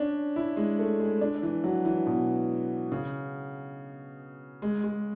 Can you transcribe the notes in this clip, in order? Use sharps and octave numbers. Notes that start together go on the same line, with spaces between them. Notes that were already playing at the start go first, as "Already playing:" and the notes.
Already playing: C#4 D4
E4
G#3
A3
G#3
D4
E3
F#3
E3
B2
C#3
G#3
G#3